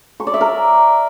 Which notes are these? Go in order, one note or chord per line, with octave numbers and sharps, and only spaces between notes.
C#6
D5
E5
A#4